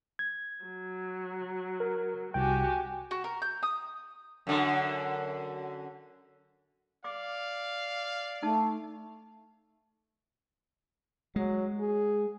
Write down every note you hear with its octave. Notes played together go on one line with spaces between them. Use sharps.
G#6
F#3
A#4
C2 F#4 G4 G5 G#5
F#4
A#4
G6
D#6
F#2 D3
D5 F5 D6
A3 D#4 A5
F#3 G#3
G#4